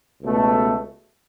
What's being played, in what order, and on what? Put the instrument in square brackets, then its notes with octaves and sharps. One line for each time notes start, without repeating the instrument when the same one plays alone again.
[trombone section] C#2 B2 A3